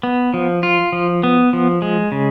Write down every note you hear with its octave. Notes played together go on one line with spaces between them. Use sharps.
B3
F3
F4
F3
B3
F3
G#3
C#3